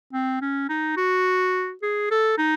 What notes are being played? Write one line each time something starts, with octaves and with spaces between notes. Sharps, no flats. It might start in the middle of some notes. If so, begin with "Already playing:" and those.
C4
C#4
D#4
F#4
G#4
A4
D#4